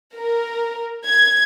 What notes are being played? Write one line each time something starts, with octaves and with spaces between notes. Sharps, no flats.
A#4
G#6